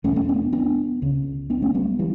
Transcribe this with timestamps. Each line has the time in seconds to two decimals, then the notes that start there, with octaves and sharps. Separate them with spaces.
0.04 E2 B2 A3 C#4
0.16 A3 C#4
0.29 B3 D4
0.53 B3 D4
1.02 C#2 C#3
1.50 B3 D4
1.62 A3 C#4
1.74 G3 B3
1.99 E3 G3